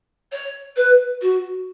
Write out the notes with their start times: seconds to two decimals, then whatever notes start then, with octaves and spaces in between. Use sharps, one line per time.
0.31 C#5
0.76 B4
1.21 F#4